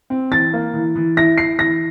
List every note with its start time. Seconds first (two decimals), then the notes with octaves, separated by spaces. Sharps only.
0.10 C4
0.31 E3 A6
0.53 A#3
0.74 E3
0.96 E3
1.17 E4 A#6
1.38 E4 C7
1.59 E3 A#6